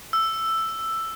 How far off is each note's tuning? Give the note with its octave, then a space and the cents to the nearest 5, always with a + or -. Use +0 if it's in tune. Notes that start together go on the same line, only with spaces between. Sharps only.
E6 +5